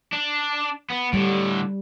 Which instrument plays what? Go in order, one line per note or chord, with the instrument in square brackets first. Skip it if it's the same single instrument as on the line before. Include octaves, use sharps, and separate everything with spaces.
[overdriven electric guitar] D4
B3
[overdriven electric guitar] A2 D3 [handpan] G3